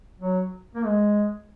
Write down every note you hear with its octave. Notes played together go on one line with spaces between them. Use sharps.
F#3
A#3
G#3